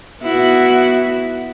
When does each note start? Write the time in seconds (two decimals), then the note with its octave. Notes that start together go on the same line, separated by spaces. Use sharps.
0.22 B3 E4 F#4